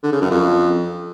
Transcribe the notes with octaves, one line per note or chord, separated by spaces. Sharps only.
D3
C#3
F#2
F2